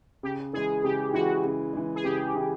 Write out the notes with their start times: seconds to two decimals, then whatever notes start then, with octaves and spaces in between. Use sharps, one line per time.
0.23 C#3 G4
0.53 E3 G#3 G#4
0.84 C#3 G4
1.13 E3 G#3 F#4
1.44 C#3
1.73 E3 G#3
1.95 G#4
2.04 C#3 G4
2.34 E3 G#3